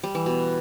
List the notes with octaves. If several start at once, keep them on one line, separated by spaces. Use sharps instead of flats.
G3
E3
B2